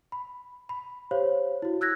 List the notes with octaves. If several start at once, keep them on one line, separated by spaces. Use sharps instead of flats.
B5
B5
G4 C5 C#5 F5
E4 F#4
E6 F#6 G#6 A#6